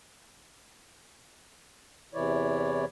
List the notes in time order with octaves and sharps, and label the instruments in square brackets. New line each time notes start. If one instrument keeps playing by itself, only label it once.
[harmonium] E2 C3 E3 E4 C#5 D5